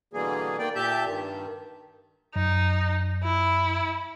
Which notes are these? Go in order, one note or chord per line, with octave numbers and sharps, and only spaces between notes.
B2 D3 E3 G3 A#3 G#4
D#3 A#3 D5 G5
A#2 G4 E5 A5 G6
G2 D#3
F#2 D#4
E4